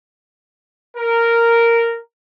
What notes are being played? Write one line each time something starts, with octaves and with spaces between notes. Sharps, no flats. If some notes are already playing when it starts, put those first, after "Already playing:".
A#4